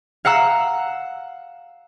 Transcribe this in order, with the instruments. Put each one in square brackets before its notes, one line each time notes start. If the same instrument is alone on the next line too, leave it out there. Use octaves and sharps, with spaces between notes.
[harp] F5 F#5 A#5 E6